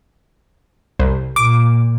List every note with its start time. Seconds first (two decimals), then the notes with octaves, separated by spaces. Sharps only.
0.99 C2
1.36 A#2 D6